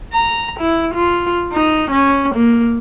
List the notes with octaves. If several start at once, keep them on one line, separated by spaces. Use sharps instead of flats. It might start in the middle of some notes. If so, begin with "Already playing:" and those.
A#5
E4
F4
D#4
C#4
A#3